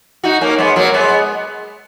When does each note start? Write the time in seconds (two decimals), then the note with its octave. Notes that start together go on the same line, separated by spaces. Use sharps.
0.24 D#4 F#4
0.41 A#3 C#4
0.58 G#3 B3
0.76 F#3 A#3
0.94 G#3 B3